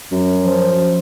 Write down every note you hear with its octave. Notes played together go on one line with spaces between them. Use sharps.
F#2
F3